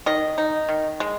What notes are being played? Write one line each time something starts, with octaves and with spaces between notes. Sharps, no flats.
D#3 D#5
D#4
D#3
G#3